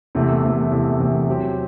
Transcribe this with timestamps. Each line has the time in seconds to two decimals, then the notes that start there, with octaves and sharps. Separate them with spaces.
0.15 E2 C3 E3 A3
0.43 E2 C3 E3 A3
0.71 E2 C3 E3 A3
0.99 E2 C3 E3 A3
1.27 F#3 C4 G4